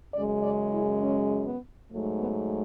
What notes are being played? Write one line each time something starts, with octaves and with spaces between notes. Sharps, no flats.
F#2 C#3 G#3 D5
D5
E4
C#4
B3
G#2 F#3 A3
B3